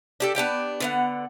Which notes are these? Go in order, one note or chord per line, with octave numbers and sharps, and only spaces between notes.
D4 G4 A4
B3 D4 G4 G5
D3 B3 F#5